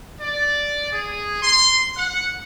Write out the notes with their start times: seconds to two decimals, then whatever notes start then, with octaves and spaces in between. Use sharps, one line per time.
0.20 D5
0.92 G#4
1.42 C6
1.96 F#5